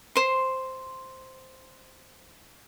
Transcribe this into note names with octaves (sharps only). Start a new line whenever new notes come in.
C5 C6